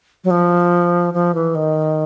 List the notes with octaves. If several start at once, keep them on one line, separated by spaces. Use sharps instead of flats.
F#3
F3
F3
E3
D#3